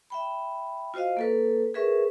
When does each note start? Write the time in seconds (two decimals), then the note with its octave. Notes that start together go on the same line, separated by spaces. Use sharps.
0.10 E5 G5 B5
0.94 F4 F#4 C5 D#5 F5
1.17 A#3 A4 B4
1.74 G#4 A#4 B4 E5 C#6